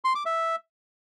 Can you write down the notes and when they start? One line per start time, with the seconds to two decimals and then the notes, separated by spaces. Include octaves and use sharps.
0.04 C6
0.15 D6
0.26 E5